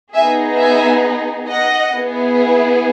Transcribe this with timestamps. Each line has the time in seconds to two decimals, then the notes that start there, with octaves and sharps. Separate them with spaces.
0.13 B3 D#4 G#4 E5 G#5
0.58 E5 G#5
1.48 D#5 F#5
1.93 B3 E4 G#4